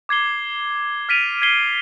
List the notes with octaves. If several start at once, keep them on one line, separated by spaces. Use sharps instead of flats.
D6 G#6 C7 G7
F6 A6 B6 D7 D#7 F7
G#6 B6 C7 G7